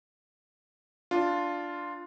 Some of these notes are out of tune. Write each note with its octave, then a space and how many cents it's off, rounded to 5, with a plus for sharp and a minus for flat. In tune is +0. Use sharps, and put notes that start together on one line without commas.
D4 +0 F4 +0